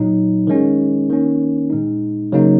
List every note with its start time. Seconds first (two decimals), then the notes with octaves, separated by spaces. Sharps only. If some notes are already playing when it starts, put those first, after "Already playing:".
Already playing: A#2 F#3 D#4
0.47 D#3 G#3 C#4
1.09 D#3 A#3 C#4
1.70 A#2 G#3 D#4
2.33 C#3 F#3 A#3 D#4